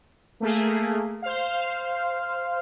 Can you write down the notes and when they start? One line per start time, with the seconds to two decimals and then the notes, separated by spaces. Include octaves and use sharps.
0.40 A3 A#3 G#4
1.22 C5 F5